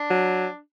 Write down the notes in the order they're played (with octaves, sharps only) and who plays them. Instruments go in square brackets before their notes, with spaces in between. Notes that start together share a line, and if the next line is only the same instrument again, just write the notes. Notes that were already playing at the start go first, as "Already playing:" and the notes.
Already playing: [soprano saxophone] D4
[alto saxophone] F#3